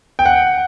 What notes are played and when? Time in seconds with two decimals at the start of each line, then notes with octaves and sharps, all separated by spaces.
0.19 G5
0.25 F#5